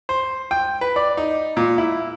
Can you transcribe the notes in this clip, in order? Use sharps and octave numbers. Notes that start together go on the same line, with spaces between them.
C5
G5
B4
D5
D#4
A#2
E4